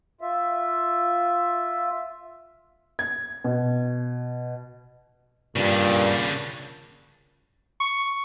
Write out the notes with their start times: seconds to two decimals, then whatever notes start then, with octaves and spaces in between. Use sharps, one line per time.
0.21 F4 E5
2.99 G#6
3.44 B2
5.56 G2 A#2 C#3 D4
7.80 C#6